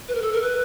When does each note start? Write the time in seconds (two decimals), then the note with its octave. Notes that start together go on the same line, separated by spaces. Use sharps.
0.08 B4
0.15 A#4
0.22 A4
0.33 A#4
0.42 B4